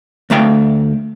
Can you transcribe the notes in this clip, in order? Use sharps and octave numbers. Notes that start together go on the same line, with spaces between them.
D2 A3 F5 G5